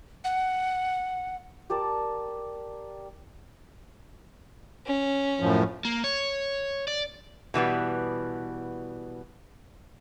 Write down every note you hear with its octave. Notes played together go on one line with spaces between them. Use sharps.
F#5
G4 A#4 D5 A5
C#4
F#2 A2 F3
A#3
C#5
D5
B2 E3 G3 B3